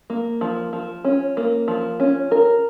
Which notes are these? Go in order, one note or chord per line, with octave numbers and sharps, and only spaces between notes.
A#3
F3
F3
C#4
A#3
F3
C#4
A#4